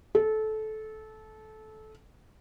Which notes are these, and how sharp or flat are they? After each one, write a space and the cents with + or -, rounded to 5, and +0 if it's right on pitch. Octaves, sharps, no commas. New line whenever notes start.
A4 -20